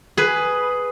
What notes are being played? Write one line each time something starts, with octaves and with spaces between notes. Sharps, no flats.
G#4 B4